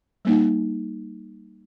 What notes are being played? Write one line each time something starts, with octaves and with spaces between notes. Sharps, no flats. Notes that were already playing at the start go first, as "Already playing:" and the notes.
G3 A#3 D#4